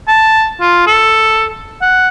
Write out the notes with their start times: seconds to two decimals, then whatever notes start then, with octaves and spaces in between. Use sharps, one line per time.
0.08 A5
0.61 F4
0.87 A4
1.82 F#5